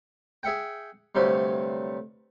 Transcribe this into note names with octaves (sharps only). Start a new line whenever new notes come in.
G#4 E5 F#5 G5
D2 G2 C3 F#3 G3